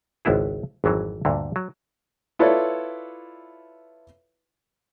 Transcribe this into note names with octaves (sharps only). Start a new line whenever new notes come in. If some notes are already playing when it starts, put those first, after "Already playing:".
G#1 C#2 B3 E4 G#4
G#1 F2 E3 F#3
D2 G2 A#2 D3
F#3
E4 F4 A4 B4 C#5 D5